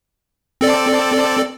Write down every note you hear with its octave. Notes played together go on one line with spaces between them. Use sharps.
C4 A4 D5